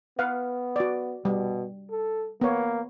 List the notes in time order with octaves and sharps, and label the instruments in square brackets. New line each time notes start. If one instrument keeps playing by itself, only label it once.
[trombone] B3 [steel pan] B4 F5 F#5
[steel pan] F#4 D5
[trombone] B2 [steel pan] G3
[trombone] A4
[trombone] A#3 [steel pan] B3 C#5